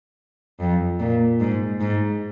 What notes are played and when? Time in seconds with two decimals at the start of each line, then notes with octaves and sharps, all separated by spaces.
0.60 F2
1.00 A#2
1.40 G#2
1.81 G#2